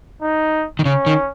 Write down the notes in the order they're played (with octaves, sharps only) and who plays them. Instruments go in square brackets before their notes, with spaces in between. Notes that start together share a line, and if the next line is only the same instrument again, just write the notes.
[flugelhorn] D#4
[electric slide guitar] D#3
[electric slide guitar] C#3 [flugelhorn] C#4
[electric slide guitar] D#3